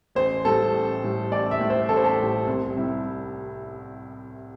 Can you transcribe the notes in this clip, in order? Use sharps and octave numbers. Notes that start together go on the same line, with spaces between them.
A1 C5
A2 G3 A4
A1
A2 G3
A1 D5
E5
A2 G3
C5
A1 A4
C5
A4
A2 G3
C2
C3 G3 E4